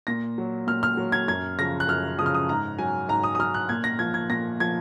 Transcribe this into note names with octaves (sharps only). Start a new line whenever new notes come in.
A#2 A#6
F#3
A#2 F6
F6
F#3
G#6
F#2 G#6
C#3 F3 A#6
F#6
F#2 F6
C#3 F3 D#6 F6
D#6
G#2 A#5
F#3 G#5
G#2 A#5
D#6
D#6
F#3 F6
F#6
A#2 G#6
A#6
F3 G#6
G#6
A#2 A#6
F3 G#6